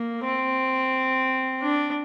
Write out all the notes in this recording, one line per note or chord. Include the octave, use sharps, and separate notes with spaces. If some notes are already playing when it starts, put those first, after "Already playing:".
Already playing: A#3
C4
D4